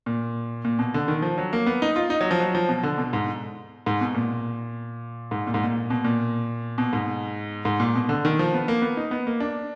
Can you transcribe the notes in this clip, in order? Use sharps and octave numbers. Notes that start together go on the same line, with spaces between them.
A#2
A#2
B2
D3
D#3
F3
F#3
A#3
B3
D#4
F4
D#4
F#3
F3
F#3
F3
B2
D3
B2
G#2
G#2
B2
A#2
G#2
A#2
G#2
A#2
B2
A#2
B2
G#2
G#2
A#2
B2
D3
D#3
F3
B3
A#3
B3
D#4
B3
A#3
D4